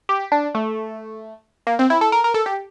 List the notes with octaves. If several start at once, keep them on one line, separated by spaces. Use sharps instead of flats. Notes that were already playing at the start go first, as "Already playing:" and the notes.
G4
D4
A3
A#3
C4
E4
A4
A#4
A#4
A4
G4